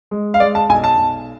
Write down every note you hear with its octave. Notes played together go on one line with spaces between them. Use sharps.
G#3
F5
G#3 D5
A5
B1 G#5
A5
B1